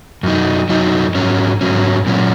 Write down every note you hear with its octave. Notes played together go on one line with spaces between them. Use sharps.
F#2 F#3 D#4
F#2 F#3 D#4
G#2 F#3 C#4
G#2 F#3 C#4
A#2 F#3 C#4